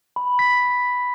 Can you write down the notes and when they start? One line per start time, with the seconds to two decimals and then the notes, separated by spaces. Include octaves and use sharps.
0.16 B5
0.39 B6